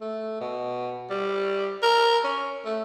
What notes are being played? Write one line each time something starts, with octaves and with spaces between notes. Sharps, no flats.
A3
B2
G3
A#4
C#4
A3